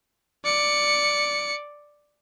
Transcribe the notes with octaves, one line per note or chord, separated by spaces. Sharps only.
D5 C#7